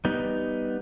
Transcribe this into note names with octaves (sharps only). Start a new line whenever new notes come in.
G3 B3 D#4